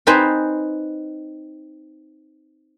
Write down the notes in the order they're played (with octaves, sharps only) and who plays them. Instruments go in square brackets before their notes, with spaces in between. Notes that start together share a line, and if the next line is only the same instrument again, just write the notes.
[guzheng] C4 D#4 B4 C5 G#5